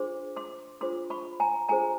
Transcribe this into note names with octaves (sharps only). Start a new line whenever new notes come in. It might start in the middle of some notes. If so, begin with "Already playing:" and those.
Already playing: D4 F4 G#4 C5 C6 D6
C6 D6
D4 F4 G#4 C5 C6 D6
B5 C#6
G#5 A#5
D4 F4 G#4 C5 G#5 A#5